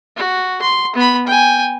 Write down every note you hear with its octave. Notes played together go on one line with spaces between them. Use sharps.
F#4
C6
B3 B5
G5 G#5